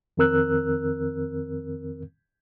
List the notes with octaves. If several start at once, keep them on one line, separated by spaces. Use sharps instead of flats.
F2 D#3 C4 A#4 E6 F#6